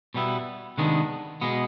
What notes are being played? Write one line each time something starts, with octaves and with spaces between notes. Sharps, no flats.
B2 G3 B3 E4
C3 D#3 G#3 B3 D4
B2 G#3 B3